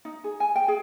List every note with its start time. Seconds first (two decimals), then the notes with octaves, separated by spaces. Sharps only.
0.05 D#4
0.24 G#4
0.40 G#5
0.56 G5
0.68 G#4